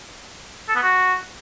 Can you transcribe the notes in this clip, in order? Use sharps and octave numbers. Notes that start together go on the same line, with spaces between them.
A4
B3
F#4